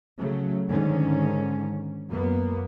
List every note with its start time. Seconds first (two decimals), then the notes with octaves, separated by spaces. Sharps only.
0.18 C#3 F#3 A3
0.67 G#2 D3 D#3 C#4
2.08 F#2 A#3 B3